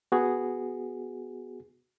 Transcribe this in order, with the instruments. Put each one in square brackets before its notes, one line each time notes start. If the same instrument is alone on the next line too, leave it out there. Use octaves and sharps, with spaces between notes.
[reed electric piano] B3 F#4 G#4